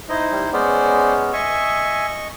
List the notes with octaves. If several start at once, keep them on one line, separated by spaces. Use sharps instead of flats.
D#4 E4 C5 D#5
G3
G#3 B3 C#4 C5 D5
D#5 E5 G#5 C#6